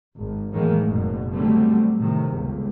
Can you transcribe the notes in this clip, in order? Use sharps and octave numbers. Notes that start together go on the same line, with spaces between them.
G#1
A2 D#3 E3 F#3 G#3 A#3
F#1 F#2 B2
B2 D3 F#3 G3 A3 C4
A2 C3 D#3
G1 C#2